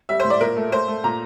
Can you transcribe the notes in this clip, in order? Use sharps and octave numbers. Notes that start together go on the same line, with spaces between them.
G3 E5
C5
A2
D5
A#2 A#4
A3
A3 C5
A3
A#2 A#5